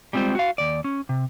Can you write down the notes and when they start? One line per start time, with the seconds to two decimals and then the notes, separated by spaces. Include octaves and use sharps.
0.13 G3 G#3 C4 F4 C5
0.35 F#4 F5
0.58 D#2 D5
0.84 C#4
1.09 C3